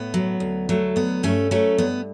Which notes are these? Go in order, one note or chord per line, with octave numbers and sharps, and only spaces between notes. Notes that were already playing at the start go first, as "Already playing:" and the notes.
Already playing: A2 B3
F#3
D2
F#3 A3
D2 B3
G2 A3 C#4
F#3 A3 C#4
G2 B3